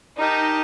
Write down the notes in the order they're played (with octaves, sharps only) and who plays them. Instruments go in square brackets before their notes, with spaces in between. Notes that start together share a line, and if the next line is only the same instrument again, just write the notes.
[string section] D#4 [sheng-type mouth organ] G4 A#4 D#5 A5